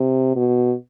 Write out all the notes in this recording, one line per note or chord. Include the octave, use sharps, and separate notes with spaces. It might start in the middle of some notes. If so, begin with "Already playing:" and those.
Already playing: C3
B2